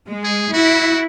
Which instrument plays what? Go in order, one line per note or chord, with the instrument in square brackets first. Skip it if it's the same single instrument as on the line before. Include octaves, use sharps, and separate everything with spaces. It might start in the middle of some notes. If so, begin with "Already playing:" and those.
[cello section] G#3
[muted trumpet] G#4
[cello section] E4 [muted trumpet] F#4